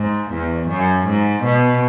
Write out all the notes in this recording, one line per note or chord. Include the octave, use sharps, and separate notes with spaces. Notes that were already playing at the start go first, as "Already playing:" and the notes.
Already playing: G#2
E2
F#2
G#2
B2